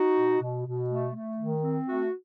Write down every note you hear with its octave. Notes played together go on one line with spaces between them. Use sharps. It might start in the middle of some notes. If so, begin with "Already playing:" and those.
Already playing: D#4 F#4
B2
B2
B2
A3
A3
D#3
C4
A3 F#4